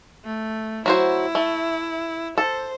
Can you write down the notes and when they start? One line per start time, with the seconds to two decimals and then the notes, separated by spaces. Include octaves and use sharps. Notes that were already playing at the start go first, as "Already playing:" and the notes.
0.25 A3
0.86 F#3 E4 F#4 C5
1.35 A3
2.38 A4 C5